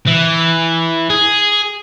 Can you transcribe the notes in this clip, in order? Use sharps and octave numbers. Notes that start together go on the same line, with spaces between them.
E3
G#4